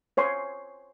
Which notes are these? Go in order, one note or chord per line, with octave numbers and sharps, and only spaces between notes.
C5 C#5 G#5 C6